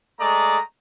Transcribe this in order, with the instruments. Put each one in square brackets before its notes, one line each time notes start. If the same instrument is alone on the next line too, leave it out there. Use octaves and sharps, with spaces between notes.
[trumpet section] G#3 A3 D5 A#5 D#6